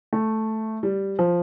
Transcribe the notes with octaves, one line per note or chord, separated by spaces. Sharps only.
A3
G3
F3